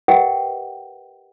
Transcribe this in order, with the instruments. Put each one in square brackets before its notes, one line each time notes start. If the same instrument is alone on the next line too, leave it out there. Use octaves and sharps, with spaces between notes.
[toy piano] G4 A#4 B4 D#5 F#5 G5